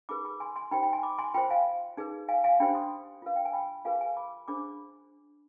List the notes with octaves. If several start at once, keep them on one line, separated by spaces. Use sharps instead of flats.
D#4 G#4 B4 B5 D6
B5 D6
G#5 C6
G#5 C6
D#4 G4 C5 G5 B5
G5 B5
G#5 C6
B5 D6
G#5 C6
F4 C5 G5 B5
F5 G#5
D#4 G#4 B4
F5 G#5
F5 G#5
D4 G4 C5 G5 B5
C6 D#6
F4 B4 F5
G5
G#5
G5 B5
F4 G#4 B4 F5 G#5
F5 G#5
B5 D6
D4 G#4 C5 B5 D6